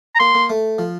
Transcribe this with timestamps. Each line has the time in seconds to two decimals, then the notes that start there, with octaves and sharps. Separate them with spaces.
0.15 A#5
0.19 A#3 C6
0.35 A#3
0.50 A3
0.79 F3